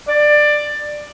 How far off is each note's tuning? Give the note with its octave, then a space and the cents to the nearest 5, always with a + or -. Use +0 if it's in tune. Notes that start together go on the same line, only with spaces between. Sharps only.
D5 +15